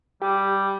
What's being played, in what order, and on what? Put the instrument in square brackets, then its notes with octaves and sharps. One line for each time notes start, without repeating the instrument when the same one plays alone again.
[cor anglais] G3 [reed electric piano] G4